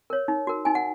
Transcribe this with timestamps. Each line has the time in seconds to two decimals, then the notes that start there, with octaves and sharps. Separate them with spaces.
0.10 A#4 C#5
0.28 D#4
0.47 F#4 A#4
0.65 D#4 G#5
0.75 F#5